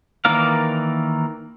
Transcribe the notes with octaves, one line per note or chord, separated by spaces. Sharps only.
D#3 E3 A#3 D5 F5